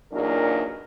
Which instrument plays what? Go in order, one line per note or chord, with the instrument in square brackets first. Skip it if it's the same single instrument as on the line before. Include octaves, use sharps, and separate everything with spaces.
[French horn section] E2 A#2 F#3 D4 D#4 A#4